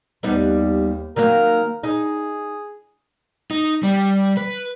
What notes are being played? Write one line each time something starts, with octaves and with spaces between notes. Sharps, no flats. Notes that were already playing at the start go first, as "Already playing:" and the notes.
D#2 G3 B3 D#4
D#3 F#3 A#3 A#4
D#4 G#4
D#4
G3
B4